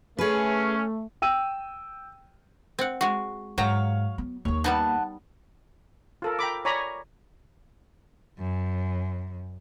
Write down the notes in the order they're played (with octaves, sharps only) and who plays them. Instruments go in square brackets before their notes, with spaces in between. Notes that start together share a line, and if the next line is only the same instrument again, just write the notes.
[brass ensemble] A3 [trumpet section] C#4 [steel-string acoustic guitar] G#4 B4
[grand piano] G5 E6 D#7
[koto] C4 F#5
G#3 F#4
[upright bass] G#2 [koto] F#3 G5 A#5 [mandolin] C#5 F5
[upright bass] B3
[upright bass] D#2 A#3 [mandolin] C#5
[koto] G3 B3 D#4 [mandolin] F#5 A5
[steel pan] F4 A4 A#4
G5 A#5 B5 D6
C#5 D5 G#5 A#5 B5 C#6
[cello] F#2